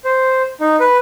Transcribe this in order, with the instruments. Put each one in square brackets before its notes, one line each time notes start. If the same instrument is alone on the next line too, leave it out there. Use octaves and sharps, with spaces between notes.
[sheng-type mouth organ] C5
D#4
B4